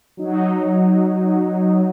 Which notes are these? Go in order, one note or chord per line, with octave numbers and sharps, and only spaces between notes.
F#3 D#4